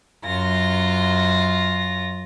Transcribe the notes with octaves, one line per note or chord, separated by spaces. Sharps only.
F#2 F4 A#6